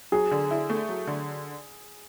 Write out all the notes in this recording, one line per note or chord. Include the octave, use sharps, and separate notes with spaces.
F#3 G#4
D3
E4
A3
F#3
D3